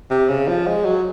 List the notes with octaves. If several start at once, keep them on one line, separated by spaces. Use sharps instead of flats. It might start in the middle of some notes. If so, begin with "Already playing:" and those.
C3
C#3
F3
G#3
F#3